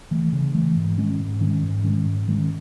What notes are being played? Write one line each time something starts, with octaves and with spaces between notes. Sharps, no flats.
E3 A3
C#3
E3 A3
G#2
D#3 G#3 C#4
G#2
D#3 G#3 C#4
G#2
D#3 G#3 C#4
G#2
D#3 G#3 C#4